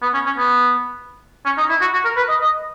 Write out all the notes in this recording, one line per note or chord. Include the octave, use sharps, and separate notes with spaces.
B3
C#4
C#4
B3
C#4
D#4
E4
F#4
F#4
A#4
B4
D#5
D#5